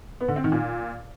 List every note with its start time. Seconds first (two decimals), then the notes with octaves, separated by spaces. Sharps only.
0.21 B3
0.28 D3
0.36 C4
0.44 D#3
0.52 A#2